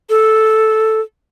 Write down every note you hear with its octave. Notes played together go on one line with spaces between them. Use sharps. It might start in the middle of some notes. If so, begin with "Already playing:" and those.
A4